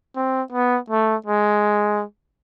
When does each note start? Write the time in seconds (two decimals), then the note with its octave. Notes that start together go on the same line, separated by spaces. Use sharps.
0.16 C4
0.52 B3
0.90 A3
1.26 G#3